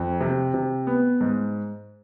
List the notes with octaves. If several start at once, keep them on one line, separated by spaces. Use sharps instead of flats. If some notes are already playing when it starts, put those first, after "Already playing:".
Already playing: F2
C3
C3
B3
G#2